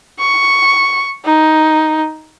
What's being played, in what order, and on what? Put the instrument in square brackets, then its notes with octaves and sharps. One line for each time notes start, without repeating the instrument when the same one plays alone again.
[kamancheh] C#6
D#4